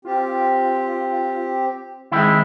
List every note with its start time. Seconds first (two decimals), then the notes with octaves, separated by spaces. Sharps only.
0.05 C4 F4 G4
2.12 D#3 G#3 C4 E4